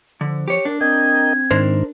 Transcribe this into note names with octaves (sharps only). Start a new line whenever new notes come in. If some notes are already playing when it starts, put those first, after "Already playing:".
D3 F3
G4 C#5
D4 A#4
C4 A#4 D#5 G5 G#6
G#2 D#3 D4 A#4 C5